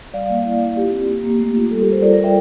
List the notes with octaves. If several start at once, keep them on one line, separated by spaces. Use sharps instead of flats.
G3 D5 F5
A#3
E4
E4
F4 G4
C4
A#3
A#3
A3
F4
G3 A4
G4 A#4
G3
A4 C5
F4 A#4 D5
A#4 D5
F4
E5 G5